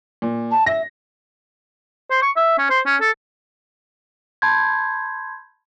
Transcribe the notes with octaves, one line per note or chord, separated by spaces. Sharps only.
A#2
A5
E5 A#6
C5
C#6
E5
C#4
C5
C#4
A4
A5 B5 C6 G6 G#6